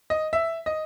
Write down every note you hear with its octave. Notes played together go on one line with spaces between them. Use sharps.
D#5
E5
D#5